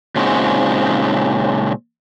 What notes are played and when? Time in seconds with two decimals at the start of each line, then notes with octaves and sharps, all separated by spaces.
0.16 A#2 C#3 G#3 C4 D#4 F#4